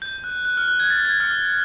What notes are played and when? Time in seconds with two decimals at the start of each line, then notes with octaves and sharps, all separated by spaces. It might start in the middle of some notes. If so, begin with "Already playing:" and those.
0.02 G6
0.24 F#6
0.45 F#6
0.57 F6
0.68 F#6
0.80 G#6
0.90 A6
1.05 G#6
1.20 F6